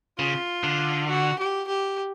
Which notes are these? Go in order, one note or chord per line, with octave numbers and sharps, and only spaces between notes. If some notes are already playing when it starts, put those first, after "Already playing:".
C#3 F4
D3
F#4
G4
G4